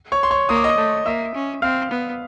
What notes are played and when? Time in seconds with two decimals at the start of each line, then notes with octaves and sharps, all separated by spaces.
0.12 C#5 C#6
0.23 C6
0.31 C#5 C#6
0.49 A#3 D#6
0.57 D6
0.64 D#5 D#6
0.78 A3
1.06 A#3 E5 E6
1.34 C#4
1.62 C4 F5 F6
1.91 B3